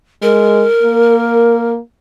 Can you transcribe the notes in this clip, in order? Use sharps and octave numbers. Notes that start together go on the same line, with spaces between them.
G#3 A#4
A#3